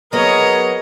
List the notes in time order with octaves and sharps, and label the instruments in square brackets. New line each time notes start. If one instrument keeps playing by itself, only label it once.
[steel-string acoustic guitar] F#3 B3 [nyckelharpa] G#4 C#5 [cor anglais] A#4 [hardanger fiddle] D#5